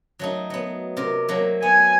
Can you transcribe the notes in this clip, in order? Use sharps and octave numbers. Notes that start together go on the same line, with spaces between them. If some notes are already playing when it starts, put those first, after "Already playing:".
F#3 A3 D#4
F#3 B3
C3 A#4
F#3 A3 A#3
B3 G#5